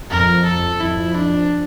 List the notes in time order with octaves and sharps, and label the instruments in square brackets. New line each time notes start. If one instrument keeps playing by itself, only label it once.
[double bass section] F2 [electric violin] A#4
[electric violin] A4
[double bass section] F2 [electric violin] E4
[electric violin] D4